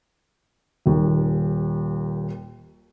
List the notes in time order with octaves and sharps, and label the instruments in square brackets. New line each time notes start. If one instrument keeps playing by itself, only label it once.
[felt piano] D#1 D#2